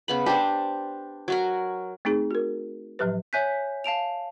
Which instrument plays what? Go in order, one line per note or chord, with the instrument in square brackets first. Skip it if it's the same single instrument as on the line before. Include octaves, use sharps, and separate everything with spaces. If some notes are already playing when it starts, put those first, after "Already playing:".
[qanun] C#3 B3 B5
[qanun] D4 C5 [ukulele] G4
[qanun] F#3 F#4 A#4
[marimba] A3 C4 D#4 G#4
F#4 A#4
A2 F3 F#3 G4 B4
[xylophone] C#5 E5 G#5 F#6 G6 B6
F5 A5 D7 F7